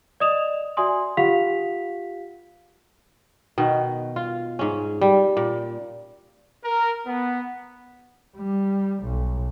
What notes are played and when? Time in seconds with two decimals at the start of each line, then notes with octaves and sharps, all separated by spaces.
0.20 D5 D#5 D#6 E7 F7
0.77 F#4 D5 E5 G#5 C6 D#6
1.17 F4 G4 F5 F#5 B6 F7
3.58 B2 D#3
4.16 F4
4.59 G#2 C#4
5.01 G3
5.37 A#2
6.64 A#4
7.07 B3
8.37 G3
9.04 B1